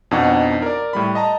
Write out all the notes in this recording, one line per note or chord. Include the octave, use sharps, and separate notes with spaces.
F2 B2 D4 D#4 F#5 C#6
A#4 D5
A2 G3 B5
D#5 A5 A#5